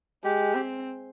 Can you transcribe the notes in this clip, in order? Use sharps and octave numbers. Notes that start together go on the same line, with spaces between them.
G#3 G4
C4